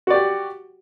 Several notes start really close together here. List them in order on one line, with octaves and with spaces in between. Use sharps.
F#4 D5 G4